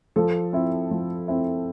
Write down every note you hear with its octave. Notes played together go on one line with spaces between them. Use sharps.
F3 A4
C4 E4
F3
C4 E4